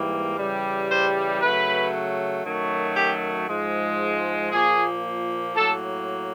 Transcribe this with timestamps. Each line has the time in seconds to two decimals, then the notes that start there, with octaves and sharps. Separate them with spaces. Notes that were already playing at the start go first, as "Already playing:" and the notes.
Already playing: G#2 E3 G3 A#3
0.38 C#3 E3 G3
0.90 C5
1.41 C#3 F#3 A3 B4
2.45 F#2 D#3 F#3 A3
2.96 G4
3.47 G#2 F3 G#3
4.52 A#2 F3 A#3 G#4
5.55 A2 F#3 A#3 A4